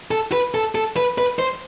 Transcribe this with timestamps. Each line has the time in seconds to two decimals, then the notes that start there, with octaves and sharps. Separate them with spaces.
0.11 A4
0.32 B4
0.54 A4
0.75 A4
0.96 B4
1.18 B4
1.39 C5